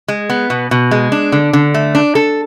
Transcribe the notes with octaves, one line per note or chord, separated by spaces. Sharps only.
G#3
B3
B2
B2
G#3
D4
D3
D3
A3
D4
A4